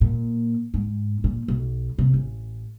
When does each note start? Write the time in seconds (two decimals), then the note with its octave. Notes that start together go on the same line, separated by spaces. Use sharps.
0.01 A#2
0.74 G#2
1.24 A#2
1.48 B1
1.98 C3
2.14 A1